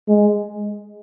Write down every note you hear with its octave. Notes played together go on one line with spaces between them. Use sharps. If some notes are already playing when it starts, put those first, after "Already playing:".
G#3